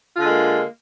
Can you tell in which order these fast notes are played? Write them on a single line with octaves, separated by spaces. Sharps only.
F4 D3 G#3 A#3